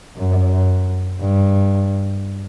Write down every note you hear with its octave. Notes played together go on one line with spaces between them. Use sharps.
F#2
G2